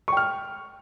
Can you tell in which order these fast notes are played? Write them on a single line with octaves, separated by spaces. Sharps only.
C#6 G5 F6